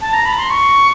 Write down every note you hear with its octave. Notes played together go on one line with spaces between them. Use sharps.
A5
A#5
B5
C6
C#6